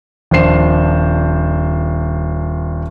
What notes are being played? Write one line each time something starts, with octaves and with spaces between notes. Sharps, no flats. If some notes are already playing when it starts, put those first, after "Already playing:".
D#1 F3 D4 C5 C7 E7